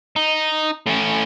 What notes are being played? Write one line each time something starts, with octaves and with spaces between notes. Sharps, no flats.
D#4
A2 C#4